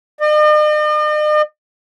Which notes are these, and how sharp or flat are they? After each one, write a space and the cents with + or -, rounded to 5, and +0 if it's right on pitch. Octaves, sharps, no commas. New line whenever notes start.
D#5 -45